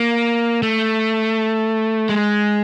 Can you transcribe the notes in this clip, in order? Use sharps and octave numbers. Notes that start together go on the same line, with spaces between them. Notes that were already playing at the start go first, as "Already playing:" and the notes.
Already playing: A#3
A3
G#3